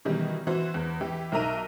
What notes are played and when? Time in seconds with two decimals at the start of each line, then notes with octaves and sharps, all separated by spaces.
0.05 B2 D#3 E3 G3
0.47 E3 F#4 C5
0.74 E2
1.01 E3 G4
1.32 B1 D#4 A#4 E5 A#5 D#7